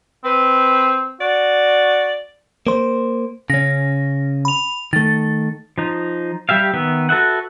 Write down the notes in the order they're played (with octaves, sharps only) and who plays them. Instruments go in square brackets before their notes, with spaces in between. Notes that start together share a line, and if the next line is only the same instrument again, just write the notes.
[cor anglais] C4 [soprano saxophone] B4
[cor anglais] F#4 [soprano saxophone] D5
[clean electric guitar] A#3 C5
[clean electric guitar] C#3 C#4 [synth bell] A#6
[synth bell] B5 F7
[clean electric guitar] D#3 A3 [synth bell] A6
[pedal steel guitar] F3 D#4
G3 G4 E5 F5
D#3 B3 E5
F#4 A4 B4 E5 F#5